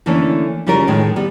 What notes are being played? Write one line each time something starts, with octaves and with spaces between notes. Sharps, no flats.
D3 E3 A3 A#3 C#4 D4
C#3 G3 C#4 F4 A#4
A2 D#3 G#3
G3 B3